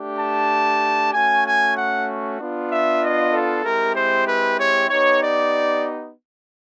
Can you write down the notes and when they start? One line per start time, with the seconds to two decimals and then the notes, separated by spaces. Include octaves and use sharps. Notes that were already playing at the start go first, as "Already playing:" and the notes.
Already playing: A3 D4 G4
0.19 A5
1.13 A3 C#4 F#4 G#5
1.45 G#5
1.76 F#5
2.39 B3 D4 F4
2.70 E5
3.02 D#5
3.32 A4
3.64 G#3 C4 E4 G4 A#4
3.95 C5
4.27 B4
4.58 C#5
4.89 B3 D#4 G4 C#5
5.21 D5